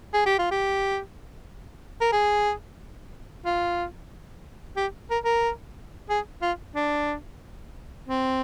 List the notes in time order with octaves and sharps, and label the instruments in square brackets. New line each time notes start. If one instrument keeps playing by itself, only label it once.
[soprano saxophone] G#4
G4
F4
G4
A#4
G#4
F4
G4
A#4
A#4
G#4
F4
D4
C4